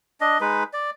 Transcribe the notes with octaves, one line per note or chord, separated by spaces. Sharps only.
D4 D#5
G#3 D#4 B4
D5